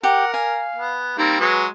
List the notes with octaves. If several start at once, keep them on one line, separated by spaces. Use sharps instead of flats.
G4 A#4 F#5
F5 G#5
B3
G3 A#3 C4 D#4
F#3 G#3 B4